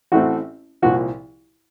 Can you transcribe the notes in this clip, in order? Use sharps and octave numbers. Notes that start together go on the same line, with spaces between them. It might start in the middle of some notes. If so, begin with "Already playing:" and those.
A1 A2 A3 C4 F#4
C2 A#2 F3 F#4